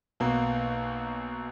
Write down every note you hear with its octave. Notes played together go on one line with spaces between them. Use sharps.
B1 B2 A#3